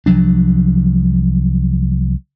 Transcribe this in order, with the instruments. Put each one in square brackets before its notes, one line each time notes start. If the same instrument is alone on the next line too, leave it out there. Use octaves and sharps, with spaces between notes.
[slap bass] C2 F3 F#3 D4